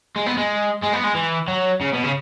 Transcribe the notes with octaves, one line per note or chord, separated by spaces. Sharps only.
G#3
B3
G#3
G#3
B3
G#3
E3
F#3
C#3
B2
C#3